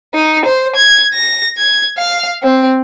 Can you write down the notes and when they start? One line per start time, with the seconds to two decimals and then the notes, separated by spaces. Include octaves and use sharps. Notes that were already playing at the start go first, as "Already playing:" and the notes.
0.15 D#4
0.45 C5
0.76 G#6
1.14 A#6
1.58 G#6
1.98 F5
2.43 C4